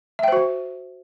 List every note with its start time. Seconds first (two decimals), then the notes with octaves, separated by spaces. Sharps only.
0.19 E5
0.23 G5
0.28 C5
0.32 F#4